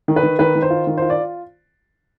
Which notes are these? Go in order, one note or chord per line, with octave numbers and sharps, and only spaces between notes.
D#3
B4
D#3
D#3 B4
D#3
C5
F4
D#3
F4 C5
D5